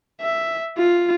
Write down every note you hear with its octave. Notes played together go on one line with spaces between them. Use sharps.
E5
F4